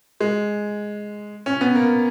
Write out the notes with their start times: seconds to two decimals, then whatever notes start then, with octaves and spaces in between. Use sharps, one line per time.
0.20 G#3
1.46 C#4
1.61 B3
1.75 A#3